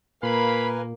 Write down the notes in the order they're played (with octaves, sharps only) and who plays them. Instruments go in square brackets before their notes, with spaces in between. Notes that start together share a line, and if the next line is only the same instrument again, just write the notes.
[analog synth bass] A#2 [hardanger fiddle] A#3 [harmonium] A#4 B4 G#5 [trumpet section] F5 B5